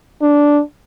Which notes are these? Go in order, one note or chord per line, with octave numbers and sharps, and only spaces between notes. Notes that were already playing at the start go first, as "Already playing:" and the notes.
D4